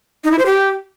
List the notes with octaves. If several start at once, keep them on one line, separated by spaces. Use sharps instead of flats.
D#4
E4
C5
G4